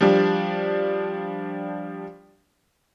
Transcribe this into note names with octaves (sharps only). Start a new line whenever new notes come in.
F3 G3 D4